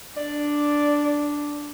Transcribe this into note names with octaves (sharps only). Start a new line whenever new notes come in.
D4 D5